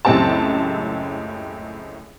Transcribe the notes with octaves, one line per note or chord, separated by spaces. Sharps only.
C#2 F#2 A2 C4 G4 A5